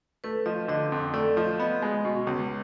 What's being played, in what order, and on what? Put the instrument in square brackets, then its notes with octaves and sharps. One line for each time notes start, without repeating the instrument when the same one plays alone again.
[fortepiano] A3 [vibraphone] B4
[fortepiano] F3 [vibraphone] D#5
[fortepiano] D3 [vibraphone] D#5
[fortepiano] F2
[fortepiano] A3 [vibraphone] D5
[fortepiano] F3 [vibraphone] D#5
[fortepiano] B3 [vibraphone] D#5
[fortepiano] G#3
B2
C#2